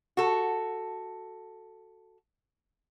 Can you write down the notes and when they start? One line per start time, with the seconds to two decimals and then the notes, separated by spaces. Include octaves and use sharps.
0.17 F#4 A4